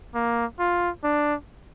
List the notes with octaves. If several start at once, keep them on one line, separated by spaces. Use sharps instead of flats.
A#3
F4
D4